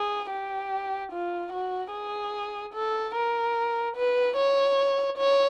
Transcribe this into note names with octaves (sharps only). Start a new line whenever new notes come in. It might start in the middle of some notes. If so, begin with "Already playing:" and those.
Already playing: G#4
G4
F4
F#4
G#4
A4
A#4
B4
C#5
C#5